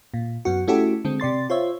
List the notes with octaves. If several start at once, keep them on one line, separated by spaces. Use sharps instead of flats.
A#2
F#2 B3 F#4
A3 C#4 E4 F#4 G4 A4
D3 G#3 C4
C3 D5 C6 A6
F4 C5 C#5 E5